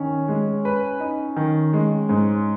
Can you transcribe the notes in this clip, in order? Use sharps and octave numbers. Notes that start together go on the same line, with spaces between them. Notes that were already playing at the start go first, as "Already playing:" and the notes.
Already playing: D#3 C#4
G#3
B4
D#4
D#3
G#3
G#2